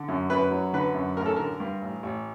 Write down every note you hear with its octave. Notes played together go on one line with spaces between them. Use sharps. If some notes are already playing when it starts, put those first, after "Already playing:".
Already playing: D3
F#2
F#2 B4
F#3
D3 B4
F#2
A1 A#4
A4
D3 A#4
G2
A1
A1